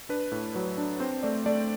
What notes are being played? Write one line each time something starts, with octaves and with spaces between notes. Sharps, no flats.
D4 B4
A2
F#3 B4
D4
C4 C5
A3 D5
A3 D5